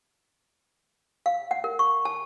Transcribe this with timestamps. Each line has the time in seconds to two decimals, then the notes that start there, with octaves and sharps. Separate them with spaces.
1.26 F5
1.51 F#5
1.64 A#4
1.79 C#6
2.05 A5